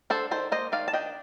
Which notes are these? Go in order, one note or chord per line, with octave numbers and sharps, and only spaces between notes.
D4 A4 C5
D#3 A4 C5
A#3 C5 D#5
D#3 D5 F5
A5
D4 D#5 G5